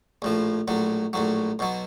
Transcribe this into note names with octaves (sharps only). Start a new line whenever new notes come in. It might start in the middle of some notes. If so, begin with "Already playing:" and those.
A#1 A2 F3
A#1 A2 F#3
A#1 A2 F#3
B1 B2 F#3